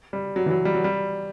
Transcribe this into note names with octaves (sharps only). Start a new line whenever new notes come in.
G3
F#3
E3
F#3
G3
F#3
G3